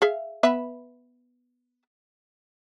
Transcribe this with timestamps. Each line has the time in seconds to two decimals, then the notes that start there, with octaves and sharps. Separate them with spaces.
0.02 G#4 E5 F5
0.43 B3 B4 E5